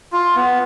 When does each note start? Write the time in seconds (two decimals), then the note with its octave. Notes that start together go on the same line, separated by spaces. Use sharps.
0.13 F4
0.36 B3